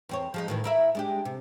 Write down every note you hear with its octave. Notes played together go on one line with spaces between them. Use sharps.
E2 C4 C#5
F3 G#3 D#4
A2 D#3 E3
E4 A#4 E5
G#3 D4 G4
C3